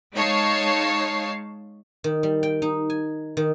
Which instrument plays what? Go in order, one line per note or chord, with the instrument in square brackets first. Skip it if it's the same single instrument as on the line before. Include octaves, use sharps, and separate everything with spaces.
[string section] G#3 D#4 C#5 F5 A5 C7
[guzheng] D#3
G3
G5
D#4
G#5
D#3